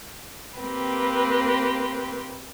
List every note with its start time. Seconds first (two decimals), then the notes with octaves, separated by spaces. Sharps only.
0.59 A#3 C4 G4 B4